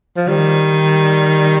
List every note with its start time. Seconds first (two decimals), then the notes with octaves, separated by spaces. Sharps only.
0.17 F3
0.28 D#3 G3